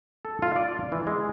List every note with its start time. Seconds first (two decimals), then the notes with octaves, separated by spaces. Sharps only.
0.25 A4
0.42 F4
0.56 D5
0.92 E3
1.07 G#3